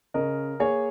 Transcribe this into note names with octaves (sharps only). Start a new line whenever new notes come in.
C#3 A#4 D#5
A#3 G#4 C#5